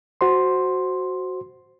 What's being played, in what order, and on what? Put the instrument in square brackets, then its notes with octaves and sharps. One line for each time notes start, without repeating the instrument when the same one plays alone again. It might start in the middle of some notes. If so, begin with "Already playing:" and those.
[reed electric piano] F#4 C5 C6